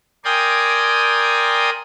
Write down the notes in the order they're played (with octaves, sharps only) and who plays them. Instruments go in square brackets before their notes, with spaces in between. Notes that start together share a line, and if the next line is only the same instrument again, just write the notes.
[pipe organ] A#4 D5 G5 G#5 C6 D#6